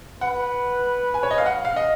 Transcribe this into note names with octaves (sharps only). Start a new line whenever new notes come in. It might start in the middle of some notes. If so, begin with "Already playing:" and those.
B4 F#5
G#5
C#5
D#5
F5
F#5
F5
D#5